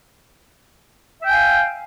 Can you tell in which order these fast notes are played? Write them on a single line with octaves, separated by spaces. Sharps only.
E5 G5 G#5 F5